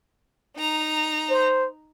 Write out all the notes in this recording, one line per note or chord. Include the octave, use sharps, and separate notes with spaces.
D#4 A#5
C5